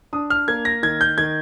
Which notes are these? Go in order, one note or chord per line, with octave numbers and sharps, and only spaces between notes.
D4 D#6
F6
A#3 G#6
A#6
D#3 G#6
G6
D#3 G#6